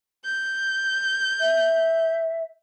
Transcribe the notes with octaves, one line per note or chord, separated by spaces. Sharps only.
G6
E5